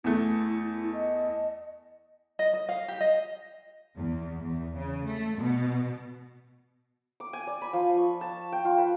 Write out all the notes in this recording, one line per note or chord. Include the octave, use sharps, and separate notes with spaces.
E2 A3 E4
D#5
D#5
D#5
F5
G4
D#5
E2
E2
C#3
A3
B2
D6
G#5
D5
B5
F3
C#6
A5
G5
F4
B4